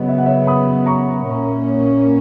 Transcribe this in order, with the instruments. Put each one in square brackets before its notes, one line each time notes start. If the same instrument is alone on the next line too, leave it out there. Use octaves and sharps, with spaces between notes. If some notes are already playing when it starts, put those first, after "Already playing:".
Already playing: [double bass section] C#3 F#3 B3 [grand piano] D#5
[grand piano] E5
F#5
C#5 E5
B5 D#6
A#5 C#6
[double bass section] A#2 A#3 C#4